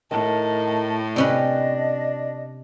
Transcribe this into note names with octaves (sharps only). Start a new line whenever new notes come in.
A2 D#3 A5
C3 C#4 D4 B4 D#5